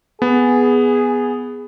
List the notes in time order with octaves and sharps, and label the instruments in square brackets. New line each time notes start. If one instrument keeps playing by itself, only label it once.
[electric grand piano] B3 [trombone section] G#4